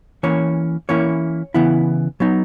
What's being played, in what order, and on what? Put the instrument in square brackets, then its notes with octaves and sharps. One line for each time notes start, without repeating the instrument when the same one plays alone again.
[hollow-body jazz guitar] E3 A#3 C#4 C#5
E3 A#3 C#4 E4 C#5
C#3 E3 B3 E4
F#3 B3 D#4